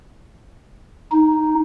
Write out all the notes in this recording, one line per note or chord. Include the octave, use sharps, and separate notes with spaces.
D#4